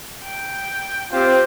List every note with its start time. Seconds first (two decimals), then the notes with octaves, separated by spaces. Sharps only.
0.23 G5
1.12 C4 F4 G4 C5